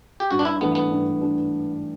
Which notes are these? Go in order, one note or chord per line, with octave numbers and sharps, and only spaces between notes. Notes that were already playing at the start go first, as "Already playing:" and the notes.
G4
G2 F#4
D4
E4
E3 A3 B3 D4
B3
G2
D4